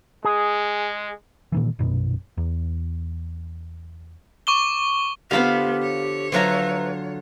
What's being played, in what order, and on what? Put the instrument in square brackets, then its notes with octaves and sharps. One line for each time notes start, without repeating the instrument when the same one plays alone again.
[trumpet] G#3 [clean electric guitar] G#4
[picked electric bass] A#2 D#3 E3
A#1 F#2 B2
E2
[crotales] C#6 D6 G7
[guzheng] D3 F4 C5 [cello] B3 [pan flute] G4 [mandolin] F5 B5
[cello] C#5
[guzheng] D3 F#3 F4 [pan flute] B4 [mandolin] C5 E5 A#5